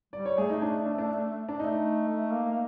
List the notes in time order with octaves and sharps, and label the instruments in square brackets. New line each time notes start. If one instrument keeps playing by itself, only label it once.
[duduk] G3 [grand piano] D5
[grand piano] C#5
[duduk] A3 [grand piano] G#4
[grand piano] D#4
D4
D4
D4
D4
[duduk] A3 [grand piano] D#4
[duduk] A3
A#3
A#3